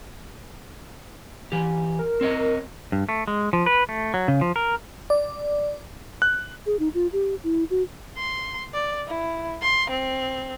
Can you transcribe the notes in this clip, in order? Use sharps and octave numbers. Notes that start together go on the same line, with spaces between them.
E3 G4
A#4
C4 C#5 D#5
G2
A3
G#3
F3
B4
A3
F#3
C#3
F3
A#4
D5
F#6
G#4
D#4
F4
G4
E4
F#4
C6
D5
E4
C6
C4